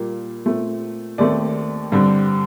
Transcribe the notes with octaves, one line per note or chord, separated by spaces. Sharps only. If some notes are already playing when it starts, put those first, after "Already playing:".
Already playing: A#2 G3 A#3
A#2 A3 C4
D#2 D#3 A3 C4 D5
G2 D3 G3 C4